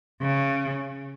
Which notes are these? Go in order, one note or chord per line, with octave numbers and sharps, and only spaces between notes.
C#3